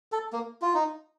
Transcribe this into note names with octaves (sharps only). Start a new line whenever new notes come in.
A4
A#3
F4
D#4